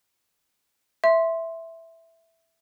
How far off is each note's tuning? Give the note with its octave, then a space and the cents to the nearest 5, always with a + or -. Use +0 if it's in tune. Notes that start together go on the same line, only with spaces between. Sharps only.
E5 +0 C6 +0